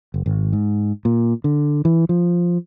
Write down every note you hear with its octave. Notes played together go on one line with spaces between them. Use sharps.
F#1
G#1
G#2
A#2
D3
E3
F3